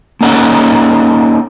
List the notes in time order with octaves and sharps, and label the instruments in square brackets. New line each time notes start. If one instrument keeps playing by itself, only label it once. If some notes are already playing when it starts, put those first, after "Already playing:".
[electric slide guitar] A#3 C#4 D#4 A4 F#5